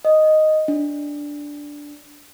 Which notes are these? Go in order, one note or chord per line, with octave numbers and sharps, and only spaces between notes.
D#5
D4